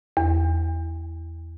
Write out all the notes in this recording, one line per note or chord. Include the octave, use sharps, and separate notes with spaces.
E2